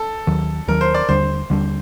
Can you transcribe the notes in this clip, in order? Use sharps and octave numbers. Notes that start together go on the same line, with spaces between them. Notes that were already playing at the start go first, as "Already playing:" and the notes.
Already playing: A4
D#2 D#3 F#3
D#2 D#3 F#3 A#4
C5
D5
D#2 D3 G3 D4 C5
D#2 D3 G3 D4